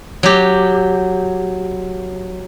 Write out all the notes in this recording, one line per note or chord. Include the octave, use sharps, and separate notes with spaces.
F#3 G4